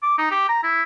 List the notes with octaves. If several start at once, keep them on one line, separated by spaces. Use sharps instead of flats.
D6
D#4
G4
A#5
E4